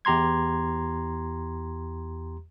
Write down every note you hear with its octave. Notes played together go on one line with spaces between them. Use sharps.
E2 G4 A#5 C6 G#6